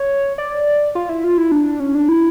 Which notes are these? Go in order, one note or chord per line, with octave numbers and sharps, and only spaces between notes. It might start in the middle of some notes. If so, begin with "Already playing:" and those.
Already playing: C#5
D5
F4
E4
F4
E4
D4
C#4
D4
E4